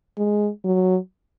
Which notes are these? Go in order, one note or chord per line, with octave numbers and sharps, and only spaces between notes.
G#3
F#3